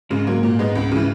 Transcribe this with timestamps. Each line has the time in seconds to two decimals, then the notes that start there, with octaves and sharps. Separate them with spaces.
0.10 G#2 C#3
0.27 F#3 A#3
0.43 A#2
0.59 G#3 B3 D#4
0.75 C#2
0.92 C#3 E3